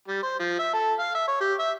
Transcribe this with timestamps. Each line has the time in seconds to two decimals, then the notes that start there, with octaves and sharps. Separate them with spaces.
0.08 G3
0.23 C5
0.40 F3
0.59 E5
0.74 A4
0.99 F5
1.15 E5
1.28 C#5
1.41 G4
1.59 E5